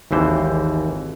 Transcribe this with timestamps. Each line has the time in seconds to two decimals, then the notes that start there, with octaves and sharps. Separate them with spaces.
0.11 G#1 D#2 E3 C5